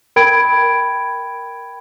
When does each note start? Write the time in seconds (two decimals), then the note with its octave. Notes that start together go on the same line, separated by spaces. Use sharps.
0.16 A#4 G5 B5 G#6 D7